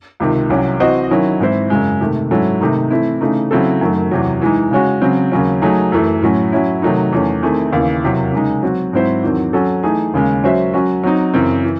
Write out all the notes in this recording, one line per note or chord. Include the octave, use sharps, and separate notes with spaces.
C#2 C3 D#3
C2 C3 F#3 C#4
E3 C4 F#4 C5 D#5
D#3 F#3 C#4 E4
G#2 E3 C4 E4 C5
F#2 C#3 G#3
C3 D#3 A3
G#2 F#3 C#4 E4 A4
C3 D#3 A3 D#4
E3 A3 C4 E4
C#3 E3 A3 D#4
C#3 F#3 C4 E4 A4
F#2 D#3 F#3 A3
E2 C3 F#3
E3 G#3 D#4
C#3 G#3 C#4 F#4
C#3 F#3 C4
D#2 C#3 F#3 C#4
F#3 A3 D#4 G#4
F#2 E3 A3
A2 F#3 C#4
F#3 C#4 E4
C3 D#3 F#3 A3 D#4
E2 D#3 A3 C#4
D#3 A3 C4 E4 G#4
D#2 C#3 E3
E2 C3 F#3
C#3 G#3 D#4
F#3 C4 F#4
G#2 F#3 C4 E4 C5
E2 D#3 F#3 C4
F#3 C#4 F#4 A4
E3 A3 D#4 G#4
D#2 C#3 G#3
F#3 C#4 F#4 C5 E5
F#3 C#4 F#4
F#3 C4 D#4
F#2 C#3 E3 C4
E3